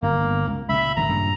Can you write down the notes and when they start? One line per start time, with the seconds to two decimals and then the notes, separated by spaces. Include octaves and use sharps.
0.02 G1 F#2 A#3
0.21 G1
0.47 C#2
0.69 C#2 A#2 E5 B5
0.96 G#1 F#2 D3 A#5
1.09 G2 A#2 C#3